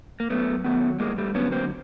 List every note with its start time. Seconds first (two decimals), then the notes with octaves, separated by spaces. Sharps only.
0.20 A#3
0.30 F#2 A3 B3
0.64 D#3 F#3 A3 B3
0.99 G2 G#3 A#3
1.18 G3 A3
1.35 D3 F#3 B3 C#4
1.52 A#3 C4